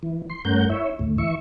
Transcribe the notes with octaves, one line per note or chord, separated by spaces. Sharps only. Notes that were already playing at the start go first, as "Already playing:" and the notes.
E3
C6
G2 A3 C#4 A#4 F#5 G6
E4 C#5 E5
D2 A2
E3 E5 C#6